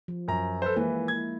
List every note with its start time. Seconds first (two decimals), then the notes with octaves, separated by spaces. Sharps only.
0.08 F3
0.28 F#2 A#5
0.62 A4 B4 C5
0.76 E3 G#3 A#3 E4 B4
1.08 G#6